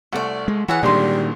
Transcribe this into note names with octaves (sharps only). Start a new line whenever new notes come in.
C2 A3 F#4 D5
G#3
E3 F#4 G#4 B4 C#5 F#5 E6
G#1 A#2 D3 D#3 G3 G#3 D#4 C6